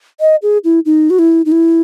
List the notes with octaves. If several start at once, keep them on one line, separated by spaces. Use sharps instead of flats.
D#5
G#4
E4
D#4
F#4
E4
D#4
E4